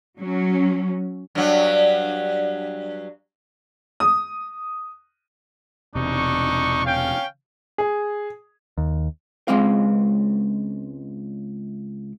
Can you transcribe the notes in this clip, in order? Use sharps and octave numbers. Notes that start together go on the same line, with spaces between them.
F#3 C#4
G2 F#3
D#6
E1 C3 D4 D#4 C#6
C#4 F5 G5
G#4
D#2
C#2 G#3 C4 F5